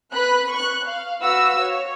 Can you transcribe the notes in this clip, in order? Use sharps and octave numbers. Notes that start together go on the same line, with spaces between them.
B4 B5 F#6
C#6 F#6
F5
F#4 B4 F5 E6
C#5